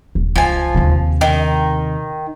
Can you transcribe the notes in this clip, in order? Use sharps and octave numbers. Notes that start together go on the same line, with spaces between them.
D#1
C#2 F3 G#5
D#2 C3
D#3